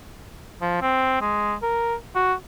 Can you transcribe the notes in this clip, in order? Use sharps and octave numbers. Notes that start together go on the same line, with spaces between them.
F3
C4
G#3
A#4
F#4